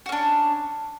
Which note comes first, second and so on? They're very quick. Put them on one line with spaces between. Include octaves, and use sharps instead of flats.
F#4 C#4 D4